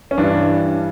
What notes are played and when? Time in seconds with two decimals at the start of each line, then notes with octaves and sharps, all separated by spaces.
0.11 C#4
0.18 G2 E3 G3 D4